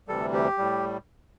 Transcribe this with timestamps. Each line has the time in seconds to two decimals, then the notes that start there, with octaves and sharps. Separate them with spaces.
0.08 D2 C3 E3 G3 A4
0.33 G4
0.58 A2 G3